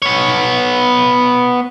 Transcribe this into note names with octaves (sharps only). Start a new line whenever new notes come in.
B3 C#5